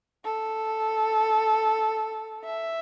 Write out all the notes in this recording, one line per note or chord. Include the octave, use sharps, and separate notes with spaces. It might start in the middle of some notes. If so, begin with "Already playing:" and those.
A4
E5